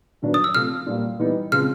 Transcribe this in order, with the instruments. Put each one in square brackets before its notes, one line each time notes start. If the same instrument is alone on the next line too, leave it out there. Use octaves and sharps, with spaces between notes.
[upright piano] G2 D#3 F#3 B3 D4
[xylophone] D#6
E6
[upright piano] C3 F3 A3 [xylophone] F6
[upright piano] A#2 G3 A#3
E3 G3 B3 D#4
[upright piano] C#3 F3 G#3 C4 [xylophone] F6